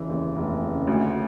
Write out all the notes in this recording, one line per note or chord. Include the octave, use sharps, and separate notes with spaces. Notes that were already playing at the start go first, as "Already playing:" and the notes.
Already playing: F1 C#3 E3
D#2
F1
C#3
D2